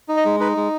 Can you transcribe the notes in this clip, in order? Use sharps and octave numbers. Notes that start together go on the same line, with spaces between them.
D#4
D#5
G#3
D#4 B4
G#3